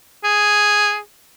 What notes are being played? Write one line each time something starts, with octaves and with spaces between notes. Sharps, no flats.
G#4